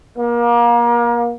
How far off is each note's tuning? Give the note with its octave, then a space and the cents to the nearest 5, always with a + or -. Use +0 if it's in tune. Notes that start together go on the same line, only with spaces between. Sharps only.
A#3 +30